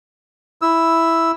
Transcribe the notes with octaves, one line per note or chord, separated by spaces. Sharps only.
E4 E6